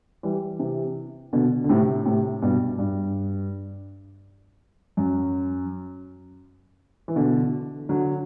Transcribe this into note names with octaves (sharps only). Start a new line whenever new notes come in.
E3 G3
C3 E3
B2 D3
D3
A2 C3
A2 C3
G2 B2
G2
F#2
E3
B2 D3
D3 F#3